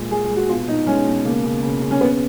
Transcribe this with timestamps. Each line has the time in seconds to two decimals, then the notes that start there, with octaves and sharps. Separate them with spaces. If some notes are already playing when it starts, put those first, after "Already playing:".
Already playing: A#2 G#3
0.11 G#3 G#4
0.24 G#4
0.30 G#3
0.36 F#4
0.49 B2 F4
0.68 B2 D#4
0.87 G#3 C#4
1.06 B2
1.25 C#3 A#3
1.44 C#3
1.63 C#3
1.82 C#3
1.91 C#4
2.01 C#3 B3